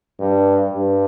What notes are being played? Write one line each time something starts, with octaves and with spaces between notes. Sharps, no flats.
G2
G2